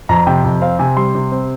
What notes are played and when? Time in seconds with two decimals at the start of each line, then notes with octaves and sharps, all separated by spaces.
0.09 F2 A#5
0.27 C3 G5
0.44 F2
0.61 C4 F5
0.79 C3 G#5
0.97 G3 C6
1.15 C3
1.32 C4